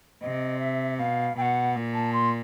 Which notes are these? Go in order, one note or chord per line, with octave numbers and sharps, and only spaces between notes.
C3 D#5
E5
B2 F5
B2 F#5 G5
A#2
A5
C6